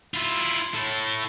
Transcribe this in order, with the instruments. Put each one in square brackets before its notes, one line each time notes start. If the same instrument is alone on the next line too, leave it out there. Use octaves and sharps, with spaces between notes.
[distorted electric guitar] E4 F4
A2 A4